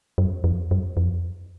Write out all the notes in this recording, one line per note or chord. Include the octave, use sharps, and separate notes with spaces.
F#2
F2
F#2
F2